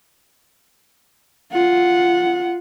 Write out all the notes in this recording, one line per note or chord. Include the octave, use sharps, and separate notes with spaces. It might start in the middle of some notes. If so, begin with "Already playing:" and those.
F4 F#5